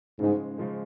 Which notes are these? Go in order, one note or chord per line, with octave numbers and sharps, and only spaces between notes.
G#2 C#3 F3 G#3
C#3 F3 G#3